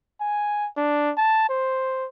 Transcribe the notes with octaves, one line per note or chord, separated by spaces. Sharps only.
G#5
D4
A5
C5